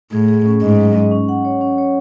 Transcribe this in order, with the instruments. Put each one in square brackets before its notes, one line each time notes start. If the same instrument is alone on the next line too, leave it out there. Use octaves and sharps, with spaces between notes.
[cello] A2 [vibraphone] G#4
[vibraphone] G#4
C#4
[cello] G#2 [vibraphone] D#5
[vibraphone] F#3
D#5
C#4
F#5
C#5
C#4
C#5